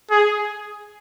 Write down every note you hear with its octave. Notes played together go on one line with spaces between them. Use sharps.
G#4